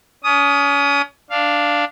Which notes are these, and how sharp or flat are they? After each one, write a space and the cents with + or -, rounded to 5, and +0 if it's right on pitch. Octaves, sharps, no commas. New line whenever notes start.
C#4 +35 D#6 +0
D4 +0 F5 +0